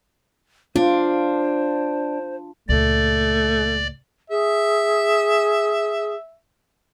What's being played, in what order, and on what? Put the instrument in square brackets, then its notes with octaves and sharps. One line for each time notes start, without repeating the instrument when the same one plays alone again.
[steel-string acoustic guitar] D4 [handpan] F4 [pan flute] C5
[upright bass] C#2 A#2 [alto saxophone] A3 [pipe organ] D5
[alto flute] G#4 [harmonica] E5